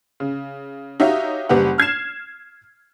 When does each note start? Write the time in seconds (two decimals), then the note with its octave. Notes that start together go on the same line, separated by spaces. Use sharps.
0.20 C#3
1.00 D#4 F#4 G4 C#5 E5 F5
1.49 F#1 G3 G4 B4 F#5
1.78 F6 G#6 C7 E7